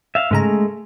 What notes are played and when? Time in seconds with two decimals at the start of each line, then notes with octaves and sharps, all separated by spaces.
0.15 E5 F5
0.31 G#2 C#3 G#3 A3 A#5